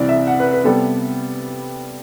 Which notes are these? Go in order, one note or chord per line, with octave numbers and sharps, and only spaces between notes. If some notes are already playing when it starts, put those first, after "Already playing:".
Already playing: C2 C3 E3 D5
E5
F#5
B4
B4
C3 G3 B3 A4